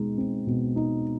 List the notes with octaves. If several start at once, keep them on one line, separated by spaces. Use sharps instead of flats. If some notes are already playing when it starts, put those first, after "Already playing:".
Already playing: B2 G#3 D#4
C4
B2
D#4